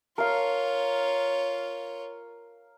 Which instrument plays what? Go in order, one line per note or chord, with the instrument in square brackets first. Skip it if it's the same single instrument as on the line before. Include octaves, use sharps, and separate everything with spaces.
[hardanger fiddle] F4 C#5 [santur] A#4 F5